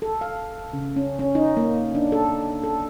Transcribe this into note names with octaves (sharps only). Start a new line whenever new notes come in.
A4
F5
C#3
C#4
C#4
D#4
A#3
D4
A4
A4